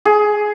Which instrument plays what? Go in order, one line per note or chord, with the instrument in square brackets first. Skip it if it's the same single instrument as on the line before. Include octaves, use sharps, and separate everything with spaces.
[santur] G#4